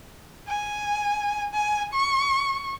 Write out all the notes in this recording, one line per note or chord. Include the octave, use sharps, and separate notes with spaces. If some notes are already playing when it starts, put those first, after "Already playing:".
G#5
G#5
C#6